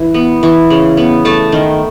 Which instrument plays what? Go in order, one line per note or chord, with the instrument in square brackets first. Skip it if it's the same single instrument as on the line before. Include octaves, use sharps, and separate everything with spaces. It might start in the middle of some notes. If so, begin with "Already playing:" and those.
Already playing: [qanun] E3
B3
E3
C#3
B3
A3 A5
D#3